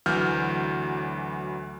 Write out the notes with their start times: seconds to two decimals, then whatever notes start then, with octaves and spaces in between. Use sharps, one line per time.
0.06 D2 E3 F#3 F6 G6